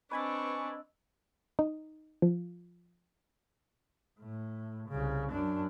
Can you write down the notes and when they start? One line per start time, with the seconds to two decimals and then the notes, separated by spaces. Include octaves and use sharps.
0.11 C4 D4 B4 D#5 G#5 B5 C#6 E6
1.59 D#4
2.22 F3
4.20 A2
4.89 C2 C#3
5.31 F#2 D4